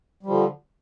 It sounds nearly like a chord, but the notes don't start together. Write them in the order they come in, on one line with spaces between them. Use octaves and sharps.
G3 F3 D3